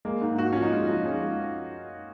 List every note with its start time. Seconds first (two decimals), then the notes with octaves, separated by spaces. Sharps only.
0.05 G#3 A#3
0.21 G#2
0.38 G#2 F#4
0.53 F3 C#4
0.62 D#4
0.72 G#3 F4
0.89 F3 D#4
1.06 G#3 C#4